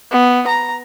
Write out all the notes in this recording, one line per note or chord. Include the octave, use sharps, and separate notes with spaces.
B3
A#5